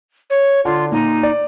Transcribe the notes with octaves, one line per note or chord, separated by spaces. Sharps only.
C#5
D3 F4
A#2 D#4
D5